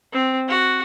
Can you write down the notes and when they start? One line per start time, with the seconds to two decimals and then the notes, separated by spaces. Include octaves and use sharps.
0.13 C4
0.48 F#4